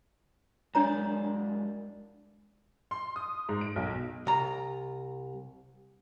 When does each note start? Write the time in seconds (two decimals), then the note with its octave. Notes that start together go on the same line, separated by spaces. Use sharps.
0.75 F#2 G#3 D4 C#5 D5 A#5
2.91 C6
3.16 D#6
3.49 G#2
3.61 D7
3.76 B1
4.27 C2 A#5